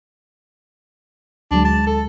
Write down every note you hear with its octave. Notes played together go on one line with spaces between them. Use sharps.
D2 F#3 G#3 D4
A5
A4